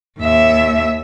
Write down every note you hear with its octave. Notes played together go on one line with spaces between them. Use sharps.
D#2 E5